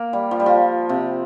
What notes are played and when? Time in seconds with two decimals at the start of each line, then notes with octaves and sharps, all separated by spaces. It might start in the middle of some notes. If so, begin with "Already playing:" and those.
Already playing: A#3
0.13 G3
0.31 F3
0.40 G3
0.46 F3
0.89 C3